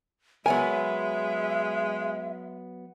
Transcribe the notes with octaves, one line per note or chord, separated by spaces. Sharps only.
F#3 G#3 B3 A#4 E5 G#5